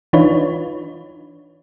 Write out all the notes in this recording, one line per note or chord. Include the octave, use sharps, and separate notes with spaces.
E3 D4 D#4 F4 B4 C#5